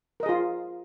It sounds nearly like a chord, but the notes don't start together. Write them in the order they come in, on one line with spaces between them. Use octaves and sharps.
A#4 D#5 G#4 F4